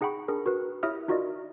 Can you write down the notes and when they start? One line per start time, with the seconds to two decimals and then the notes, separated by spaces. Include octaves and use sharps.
0.01 D#4 G#4 F#5 G5 B5 C#6
0.28 D4 G#4 A#4
0.46 F#4 A#4 B4
0.83 E4 G4 C#5 E5 D#6 F6
1.08 D#4 F4 F#4 A#4 D5 D#5